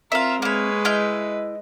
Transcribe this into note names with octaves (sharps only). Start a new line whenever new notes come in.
C4 F4 A#4 E5 F5
G#3 A#3 B4 C#5
E4 D#5 F6 G6